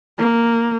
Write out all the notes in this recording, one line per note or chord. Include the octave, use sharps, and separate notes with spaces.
A#3